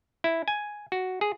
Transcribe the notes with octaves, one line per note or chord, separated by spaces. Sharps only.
E4
G#5
F#4
G#4